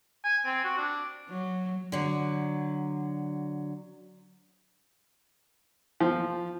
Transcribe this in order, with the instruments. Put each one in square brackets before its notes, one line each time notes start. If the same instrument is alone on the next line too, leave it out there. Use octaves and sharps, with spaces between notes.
[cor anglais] G#5
C4
F#4
D4
[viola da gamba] F#3
[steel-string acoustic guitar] D3 F#3
[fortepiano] F3